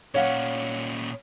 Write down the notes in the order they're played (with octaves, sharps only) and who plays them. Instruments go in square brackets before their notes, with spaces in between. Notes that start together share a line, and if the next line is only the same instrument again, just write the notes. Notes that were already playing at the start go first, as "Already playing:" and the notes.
[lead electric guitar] A#2 C#4 [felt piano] C#5 F5 F#5